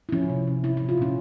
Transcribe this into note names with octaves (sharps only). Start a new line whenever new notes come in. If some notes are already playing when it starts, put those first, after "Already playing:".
E4
F3 C#4
C3
C3
F3 E4
A#2 E4
F4
A#2 C#4